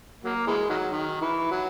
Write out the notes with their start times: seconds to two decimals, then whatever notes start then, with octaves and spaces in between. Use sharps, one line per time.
0.24 F#3 A#3
0.47 E3 G#3
0.70 D#3 F#3
0.91 D#3
1.21 E3
1.51 F#3